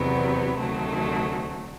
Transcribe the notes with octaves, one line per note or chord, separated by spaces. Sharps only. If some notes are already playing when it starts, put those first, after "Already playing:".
Already playing: E2 C3 D#3 F#3 B3
D2 C3 D#3 F#3 A3